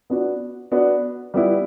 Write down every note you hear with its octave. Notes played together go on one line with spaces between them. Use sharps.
B3 D4 F#4
B3 D4 F#4
G3 B3 E4